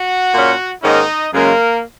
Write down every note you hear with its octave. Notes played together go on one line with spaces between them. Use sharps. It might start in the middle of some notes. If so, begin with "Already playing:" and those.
Already playing: F#4 F#5
A#2 A#3 C#4
G#2 D#3 A#3 C#4 D#4 D#5
F#2 C#3 G#3 A#3 C#4 A#4